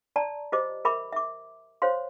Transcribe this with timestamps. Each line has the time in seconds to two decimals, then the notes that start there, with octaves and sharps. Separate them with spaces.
0.16 D5 A5 A#5
0.52 F4 G4 C5 D#5 D6
0.85 A#4 E5 B5 D6
1.12 E5 D6
1.82 C5 C#5 F5 C6